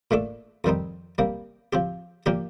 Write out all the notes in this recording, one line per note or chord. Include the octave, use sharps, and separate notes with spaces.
A#2 A3 D4 A4 D5
F2 D#3 G3 C4 D#4
C3 G3 A#3
F3 C4 G4
A#2 F3 A#3 D4 G4